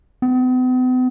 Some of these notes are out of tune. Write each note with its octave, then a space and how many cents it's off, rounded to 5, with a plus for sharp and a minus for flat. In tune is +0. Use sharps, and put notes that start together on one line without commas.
B3 +45